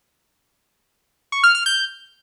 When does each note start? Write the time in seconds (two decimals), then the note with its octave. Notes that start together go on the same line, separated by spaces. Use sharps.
1.32 C#6
1.44 F6
1.55 F6
1.66 G6